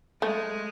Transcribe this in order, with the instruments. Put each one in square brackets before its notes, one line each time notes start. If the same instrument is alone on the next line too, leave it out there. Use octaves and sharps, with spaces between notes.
[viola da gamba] G#3 [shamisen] A3